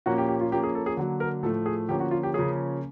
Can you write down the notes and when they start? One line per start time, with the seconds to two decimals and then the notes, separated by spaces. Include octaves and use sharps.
0.06 A#2 F3 A#3 C#4 F#4
0.18 G4
0.28 G4
0.41 F4
0.51 F3 A#3 C#4 G4
0.63 G#4
0.75 A4
0.86 G#4
0.97 D3 F#3 A#3
1.20 A#4
1.43 A2 F3 A3 A4
1.66 G#4
1.88 D3 F3 A#3 C#4 G4
2.00 F#4
2.11 F4
2.23 G4
2.34 C#3 F3 A#3 C#4 G#4